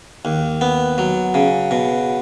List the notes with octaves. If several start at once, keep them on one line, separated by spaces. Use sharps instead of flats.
D#2
B3
F#3
C#3
B2